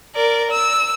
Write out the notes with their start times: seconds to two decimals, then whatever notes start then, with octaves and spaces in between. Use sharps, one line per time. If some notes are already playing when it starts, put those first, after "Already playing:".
0.15 A#4 D5
0.51 E6